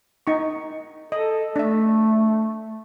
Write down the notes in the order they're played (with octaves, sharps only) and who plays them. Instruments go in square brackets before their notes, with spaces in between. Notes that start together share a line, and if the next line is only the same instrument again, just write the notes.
[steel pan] D#4 C#6
[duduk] A4 [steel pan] D#5
[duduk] A3 [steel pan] D4 E5